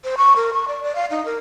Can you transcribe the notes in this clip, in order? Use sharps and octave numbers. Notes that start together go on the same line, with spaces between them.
C5
C#6
A#4
C#6
D5
D5
F5
D#4
A#4